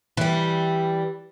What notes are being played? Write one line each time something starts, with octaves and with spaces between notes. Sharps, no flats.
E3 G3